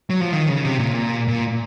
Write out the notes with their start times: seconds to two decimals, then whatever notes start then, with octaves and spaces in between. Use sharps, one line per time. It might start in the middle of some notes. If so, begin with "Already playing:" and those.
0.10 F#3
0.20 F3
0.33 D#3
0.49 C#3
0.65 C3
0.79 A#2
1.28 A#2